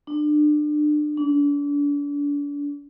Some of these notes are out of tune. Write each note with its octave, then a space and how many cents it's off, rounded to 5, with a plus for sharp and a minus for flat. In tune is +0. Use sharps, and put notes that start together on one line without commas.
D4 +30
D4 -35